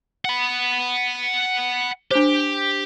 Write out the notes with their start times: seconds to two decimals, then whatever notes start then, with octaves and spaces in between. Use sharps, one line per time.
0.25 F#5 B5
2.11 D4 G4 C5